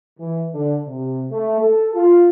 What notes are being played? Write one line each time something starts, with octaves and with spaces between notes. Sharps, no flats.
E3
D3
C3
A3
A4
F4